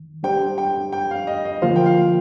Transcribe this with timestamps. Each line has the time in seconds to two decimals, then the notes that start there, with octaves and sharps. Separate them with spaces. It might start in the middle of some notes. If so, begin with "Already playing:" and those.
Already playing: D#3
0.23 G3 D4 G4 C5 G5
0.58 G5
0.93 G5
1.11 F5
1.27 D#5
1.45 D#5
1.62 D3 F3 A#3 F4 C5 F5
1.76 G5
1.86 F5
2.01 F5